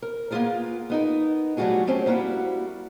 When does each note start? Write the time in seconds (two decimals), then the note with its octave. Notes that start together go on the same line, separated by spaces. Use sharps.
0.02 A#4
0.31 A#3 B3 C#4 F4 G#4 A#4
0.90 B3 D#4 A#4
1.57 F#3 G3 A3 F4 F#4 G#4
1.87 A3 C4 C#4 G4
2.06 G3 A#3 E4 F#4